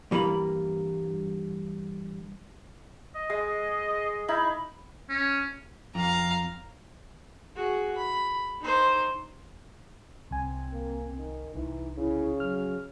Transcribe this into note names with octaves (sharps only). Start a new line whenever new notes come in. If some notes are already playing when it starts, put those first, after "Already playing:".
G2 E3 G3 A#3 B5
D#5
G#3
D#4 E4 B5
C#4
F2 F5 A#5
F#4 G#4
B5
D#4 C5
C2 C4 G#5
A#3
D#3
C2 E3 D#4
C#3 E4
F#3 F6